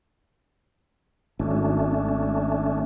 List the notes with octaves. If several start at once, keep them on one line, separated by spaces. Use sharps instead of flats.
G#1 A3 C#4 D4